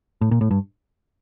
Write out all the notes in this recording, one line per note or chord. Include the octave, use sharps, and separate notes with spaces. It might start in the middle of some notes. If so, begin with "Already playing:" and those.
A2
A#2
A2
G2